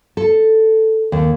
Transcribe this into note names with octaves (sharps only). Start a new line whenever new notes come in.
A4
D#2